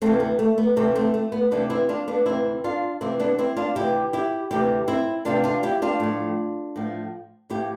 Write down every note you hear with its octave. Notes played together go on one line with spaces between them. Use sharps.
D2 C3 E3 A3 C4
B3
A3
B3
D2 C3 E3 A3 C4
A3 C4
A3
B3
D2 C3 E3 B3 D4
C4 E4
D4 F4
B3 D4
D2 C3 E3 C4 E4
D4 F4
D2 C3 E3 C4 E4
B3 D4
C4 E4
D4 F4
D2 C3 E3 E4 G4
E4 G4
D2 C3 E3 E4 G4
C4 E4
D2 C3 E3 D4 F4
D4 F4
E4 G4
D4 F4
A2 F3
A2 F3
A2 F3 E4 G4